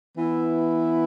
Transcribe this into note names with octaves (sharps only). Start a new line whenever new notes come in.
E3 B3 E4